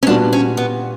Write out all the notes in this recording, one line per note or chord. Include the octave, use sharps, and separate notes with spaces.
C#4
A#2 G3 B3 D4 F#4
C#4
B3